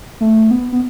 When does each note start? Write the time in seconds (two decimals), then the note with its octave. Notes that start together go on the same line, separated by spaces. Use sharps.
0.21 A3
0.51 B3
0.72 B3